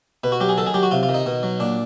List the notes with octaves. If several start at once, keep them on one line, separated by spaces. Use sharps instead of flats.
B2 B4
F#4
F#3 G4
G#4
D#3 A4
G#4
F#3 G4
F#4
C3 F4
F4
D#3
D#4
B2
F#3
A#2 D4